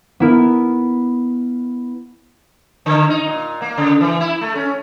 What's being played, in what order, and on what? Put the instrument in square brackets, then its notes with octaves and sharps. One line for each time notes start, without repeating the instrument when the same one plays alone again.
[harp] B3 E4 A#4
[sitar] D3
D#4
A#2
A#3
C#3
E3
E4
A3
C#4